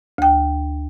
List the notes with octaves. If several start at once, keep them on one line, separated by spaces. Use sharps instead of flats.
D2 G5